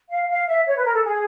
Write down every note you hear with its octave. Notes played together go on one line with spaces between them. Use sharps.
F5
F5
E5
C#5
B4
A#4
A4
G#4